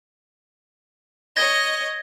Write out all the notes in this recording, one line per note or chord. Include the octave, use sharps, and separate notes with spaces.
C#5 D#5 G#6 A#6 G7